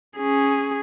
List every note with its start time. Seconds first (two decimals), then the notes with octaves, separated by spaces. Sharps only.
0.18 C#4 G#4